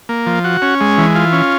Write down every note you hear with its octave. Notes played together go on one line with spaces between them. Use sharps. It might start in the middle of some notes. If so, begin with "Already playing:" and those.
A#3
F3
F#4
C#4
G#3
E3
F4
C#4